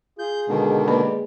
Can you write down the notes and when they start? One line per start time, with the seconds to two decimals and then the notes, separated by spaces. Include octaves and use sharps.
0.19 F4 G#4 G6
0.49 B2 D3 D#3 G#3
0.88 A#3 G4 B4 D5 B5